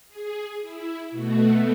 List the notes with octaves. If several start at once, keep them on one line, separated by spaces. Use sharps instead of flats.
G#4
E4
B2 A3 F#4